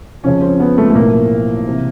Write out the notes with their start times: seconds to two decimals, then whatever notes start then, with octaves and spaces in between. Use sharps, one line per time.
0.24 F2 C#3 F3 C#4
0.42 C4
0.60 B3
0.78 A3
0.90 A3
0.95 B1 A2 F3 A#3
1.66 C3 E3